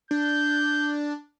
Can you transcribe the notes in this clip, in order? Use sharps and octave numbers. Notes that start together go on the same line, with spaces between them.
D4 G6